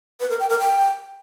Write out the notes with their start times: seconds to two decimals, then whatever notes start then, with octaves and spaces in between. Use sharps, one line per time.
0.20 B4
0.30 A#4
0.40 G5
0.50 A#4
0.59 G5